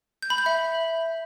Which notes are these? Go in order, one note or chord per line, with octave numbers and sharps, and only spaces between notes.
G6
B5
G6
E5